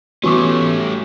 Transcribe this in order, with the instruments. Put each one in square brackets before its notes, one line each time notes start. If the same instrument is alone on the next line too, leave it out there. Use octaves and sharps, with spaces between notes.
[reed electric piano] E3 B3 [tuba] G3 [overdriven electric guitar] A3 C#4 [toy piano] F#4 C#6 D6